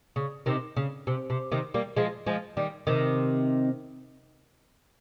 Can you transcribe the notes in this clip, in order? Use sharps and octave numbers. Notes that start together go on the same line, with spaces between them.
C#3
C3 D#3
C#3
C3
C3
C3 D#3
G3 A#3
F3 G#3
F3 G#3
D#3 G3
C3 D#3